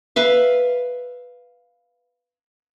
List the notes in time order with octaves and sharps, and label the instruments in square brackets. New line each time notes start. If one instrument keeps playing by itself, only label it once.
[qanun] B4 E5 F5